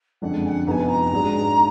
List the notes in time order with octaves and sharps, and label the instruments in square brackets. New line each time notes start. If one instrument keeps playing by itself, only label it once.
[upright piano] F#1 F2 D3 G#3 [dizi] F#5
[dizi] G#5
F#5
[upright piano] F1 F2 F3 B3 D#4 [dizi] G#5 A#5
[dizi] A#5
[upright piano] G#2 F#3 D4 G#4